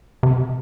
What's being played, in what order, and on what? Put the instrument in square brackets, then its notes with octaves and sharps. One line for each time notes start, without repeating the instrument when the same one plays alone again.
[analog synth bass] C3